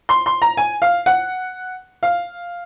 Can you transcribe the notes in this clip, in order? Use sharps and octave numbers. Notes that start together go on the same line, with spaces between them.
C6
C6
A#5
G#5
F5
F#5
F5